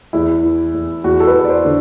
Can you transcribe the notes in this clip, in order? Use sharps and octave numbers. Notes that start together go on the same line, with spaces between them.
E2 E4
E3
E2
E2 F#4
A4
B4
E2
D5
C5
D3